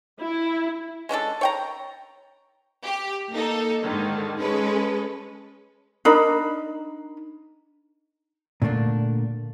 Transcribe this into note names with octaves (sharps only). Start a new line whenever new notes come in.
E4
G#3 C#4 D4 A4
C#5 G5 A#5
G4
A#3 D#4 A4
G#2 D3 D#3
G#3 C#4 G#4 A4 B4
D4 D#4 A#4 B5
A#2 D3 A3 A#3 D4